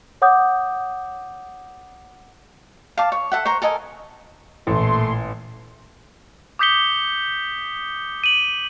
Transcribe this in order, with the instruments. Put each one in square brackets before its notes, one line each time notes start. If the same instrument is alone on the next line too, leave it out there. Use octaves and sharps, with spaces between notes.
[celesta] C#5 F#5 D6 D#6 G6
[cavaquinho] F5 A5 D6
C#5
A4 E5 F#5
C5 C#5 A#5
A4 A#4 D#5 G#5
[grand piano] A1 [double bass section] A#2 [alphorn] A3 [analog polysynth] C6
[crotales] D6 D#6 G6 B6 C#7 G7
D#7 F#7